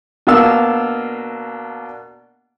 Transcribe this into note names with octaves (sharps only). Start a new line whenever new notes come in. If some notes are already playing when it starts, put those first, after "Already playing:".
B2 A#3 D4 F5 E6